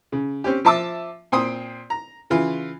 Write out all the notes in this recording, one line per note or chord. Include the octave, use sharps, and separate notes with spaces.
C#3
C4 C#4 G4
F3 E5 A5 D6 E6
A#2 C4 G5 C6 D#6
A#5
C#3 E3 F4